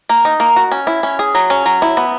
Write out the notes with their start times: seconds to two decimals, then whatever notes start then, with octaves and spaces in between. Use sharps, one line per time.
0.09 A#3
0.25 D#4
0.40 A#3
0.56 F#4
0.72 C#4
0.87 E4
1.03 C#4
1.19 G#4
1.35 F#3
1.50 C#4
1.66 F#3
1.82 E4
1.97 B3